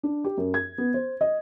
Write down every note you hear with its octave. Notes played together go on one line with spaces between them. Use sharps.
D4
G4
F#2
G#6
B3
C5
D#5